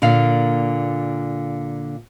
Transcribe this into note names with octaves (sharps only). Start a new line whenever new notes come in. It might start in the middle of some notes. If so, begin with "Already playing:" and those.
A#2 D3 A#3 F5